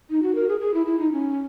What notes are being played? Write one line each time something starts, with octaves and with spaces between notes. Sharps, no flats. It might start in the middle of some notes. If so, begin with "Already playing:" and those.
D#4
F#4
A#4
G#4
G#4
E4
E4
D#4
C#4